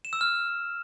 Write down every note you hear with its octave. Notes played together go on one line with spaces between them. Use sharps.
E7
E6
F6